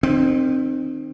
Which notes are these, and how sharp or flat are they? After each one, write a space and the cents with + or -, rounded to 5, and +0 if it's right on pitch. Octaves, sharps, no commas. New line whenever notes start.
D#3 -35 C4 +0